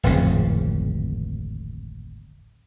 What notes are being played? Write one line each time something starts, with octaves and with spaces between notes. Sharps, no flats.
D1 G#1 F2 C#3